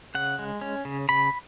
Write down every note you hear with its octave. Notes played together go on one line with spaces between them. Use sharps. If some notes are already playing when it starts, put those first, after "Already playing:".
C#3 F#5
G#3
C#4
C#3
C#3 B5